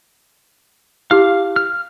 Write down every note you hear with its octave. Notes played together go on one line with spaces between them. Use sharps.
E4 G4 F5 D6 F6
F6